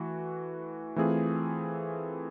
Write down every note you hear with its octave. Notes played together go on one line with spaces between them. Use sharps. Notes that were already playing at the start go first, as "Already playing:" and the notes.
Already playing: E3 A3 F#4
E3 A3 C4 F4 G#4